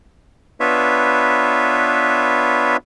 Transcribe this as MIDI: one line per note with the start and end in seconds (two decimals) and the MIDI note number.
0.60 2.77 59
0.60 2.77 62
0.60 2.77 65
0.60 2.77 71
0.60 2.77 73
0.60 2.77 76